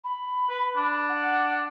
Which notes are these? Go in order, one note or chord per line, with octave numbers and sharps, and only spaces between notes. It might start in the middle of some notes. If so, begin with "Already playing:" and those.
B5
B4
D4
F#5